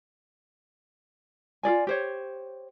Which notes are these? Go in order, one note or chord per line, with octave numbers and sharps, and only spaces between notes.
F4 G#4 D5 G#5
G4 C5 C#5